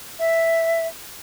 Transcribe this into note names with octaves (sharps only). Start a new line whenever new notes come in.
E5